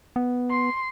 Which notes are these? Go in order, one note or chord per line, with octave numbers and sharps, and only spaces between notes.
B3
C6